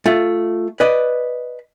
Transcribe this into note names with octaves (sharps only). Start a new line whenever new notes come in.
A3 F4
B4 D5 D#5